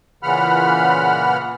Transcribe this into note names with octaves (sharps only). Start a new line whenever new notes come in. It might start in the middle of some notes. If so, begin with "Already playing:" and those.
A#2 C#3 E3 F#5 B5 F6